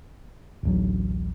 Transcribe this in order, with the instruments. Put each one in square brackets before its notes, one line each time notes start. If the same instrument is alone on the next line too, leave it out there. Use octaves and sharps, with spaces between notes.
[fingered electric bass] D1 A1 F#3